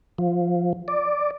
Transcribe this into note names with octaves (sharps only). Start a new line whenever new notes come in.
F3
D5